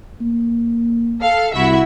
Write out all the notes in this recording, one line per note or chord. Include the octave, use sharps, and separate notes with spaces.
A#3
A4 F5
C2 E4 F#4 E5